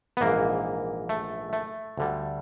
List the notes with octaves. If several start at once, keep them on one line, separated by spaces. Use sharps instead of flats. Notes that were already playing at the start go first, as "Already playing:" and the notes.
B3
A#1 G#2 E3 A#3
A3
A3
D2 D3 G3